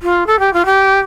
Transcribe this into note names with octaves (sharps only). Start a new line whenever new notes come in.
F4
A4
G4
F4
G4